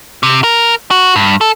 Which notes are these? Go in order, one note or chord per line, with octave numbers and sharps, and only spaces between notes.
C3
A#4
F#4
G2
A4